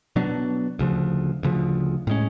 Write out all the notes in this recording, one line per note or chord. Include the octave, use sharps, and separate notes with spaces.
B2 F#3 B3 D4
D2 C#3 F3
D2 C#3 F3
A2 G#3 C#4